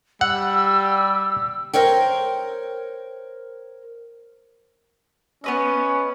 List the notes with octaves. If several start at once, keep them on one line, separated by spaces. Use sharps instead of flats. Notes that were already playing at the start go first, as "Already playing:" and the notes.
G3 F#5 E6
A#4 C5 C#5 G5
B3 C#4 B4 D#5